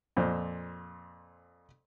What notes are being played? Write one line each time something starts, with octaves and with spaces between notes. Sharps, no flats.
F2 A#2 C5